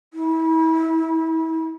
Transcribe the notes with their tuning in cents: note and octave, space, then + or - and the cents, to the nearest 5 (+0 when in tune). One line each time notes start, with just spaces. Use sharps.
E4 -35